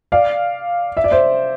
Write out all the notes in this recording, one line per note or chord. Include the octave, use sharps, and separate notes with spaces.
D5 F5
E5
D5
C5 E5